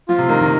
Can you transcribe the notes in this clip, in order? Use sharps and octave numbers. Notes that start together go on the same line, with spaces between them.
F3 F4
C3
D#3 A#4
D#3